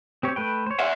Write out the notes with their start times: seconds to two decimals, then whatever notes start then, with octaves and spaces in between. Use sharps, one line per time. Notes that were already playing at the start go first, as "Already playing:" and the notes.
0.23 C4 G4 C#5
0.36 A3 B4 G5
0.66 C5 C#5
0.80 E5 F#5